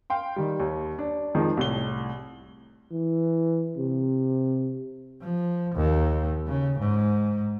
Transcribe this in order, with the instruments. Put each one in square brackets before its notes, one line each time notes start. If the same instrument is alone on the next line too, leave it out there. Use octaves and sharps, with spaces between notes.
[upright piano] F5 G5 C6
D#3 G3
D#2
D4
F2 D#3 F3 G#3
C2 A2 G7
[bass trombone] E3
C3
[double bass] F3
D#2
C#3
G#2